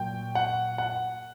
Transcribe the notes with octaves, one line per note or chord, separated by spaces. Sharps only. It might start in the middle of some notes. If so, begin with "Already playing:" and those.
Already playing: A#2 F#3 G5
F#5
F#5